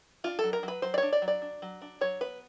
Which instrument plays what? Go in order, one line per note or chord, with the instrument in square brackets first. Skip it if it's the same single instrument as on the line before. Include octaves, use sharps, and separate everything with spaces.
[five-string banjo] D4 F4
F#3 A4
A#4
F#3 B4
F#3 C5
D5
C#5
D4
D5
F#3
D5
D4
F#3
D4
F#3 C#5
B3 B4